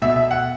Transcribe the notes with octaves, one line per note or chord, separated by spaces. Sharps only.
B2 E5
E5
F#5